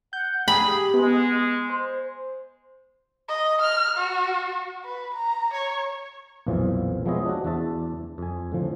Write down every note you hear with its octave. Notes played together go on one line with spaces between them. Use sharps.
F#5 G6
G4 G#4 B5
G#3 B3
C5
D#5
F6
F#4
B4
A#5
C#5
B1 F2 A#2 E3 F3
F3 G#3 B3 C#5 D#5 E5
D4 F#4
E2 D4 E5 A5
F2 G#5
A2 D3 F3